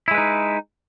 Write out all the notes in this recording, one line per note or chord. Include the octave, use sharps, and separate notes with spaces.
G#3 D#4 E4 B4